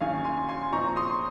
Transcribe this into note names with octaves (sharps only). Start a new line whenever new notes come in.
D#2 D#3 F#3 C#4 F5 G#5
G#5 C6
G#5 C6
A#2 F3 C4 D#4 A#5 C#6
C6 D#6